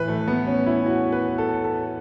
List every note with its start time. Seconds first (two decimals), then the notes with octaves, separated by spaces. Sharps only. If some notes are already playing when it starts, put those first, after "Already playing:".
Already playing: A2 E3 B4
0.08 A3
0.28 B3
0.47 C#4
0.66 E4
0.86 F#4
1.12 B4
1.38 A4
1.65 A4